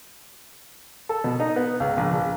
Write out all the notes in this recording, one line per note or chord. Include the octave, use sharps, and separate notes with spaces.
A4
B2
D#4
B3
C#2
A#1
A#1